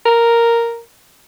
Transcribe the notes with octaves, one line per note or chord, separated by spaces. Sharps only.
A#4